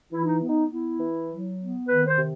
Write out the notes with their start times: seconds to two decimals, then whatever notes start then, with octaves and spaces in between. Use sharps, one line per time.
0.12 E3 E4
0.24 D#4
0.41 B3
0.50 D#4
0.70 B3 E4
1.00 E3
1.29 F#3
1.58 B3
1.87 D#3 B4
2.07 C5
2.17 C3